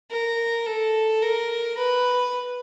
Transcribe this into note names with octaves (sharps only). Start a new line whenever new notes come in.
A#4
A4
A#4
B4